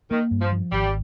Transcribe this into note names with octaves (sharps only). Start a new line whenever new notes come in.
D#3 A#3
G2
F3
F3
G#1 G3